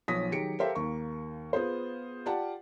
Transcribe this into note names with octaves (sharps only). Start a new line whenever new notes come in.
B1 F3 C#5 D#6 A#6 B6
D#3 F#3 G4 G#4 C#7 D7
G4 A4 A#4 C5 E5 F5
D#2 A#3 C#6
B3 F4 G#4 C5
F4 G4 D5 F#5 A5